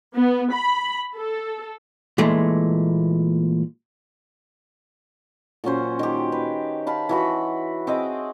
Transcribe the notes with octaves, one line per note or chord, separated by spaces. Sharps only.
B3
B5
A4
A#2 E3 G#3 A3
A#2 F#3 C#4 C5
D#3 G4
B4
F5 A5 B5
E3 F#4 B5
C4 G#4 D#5 D6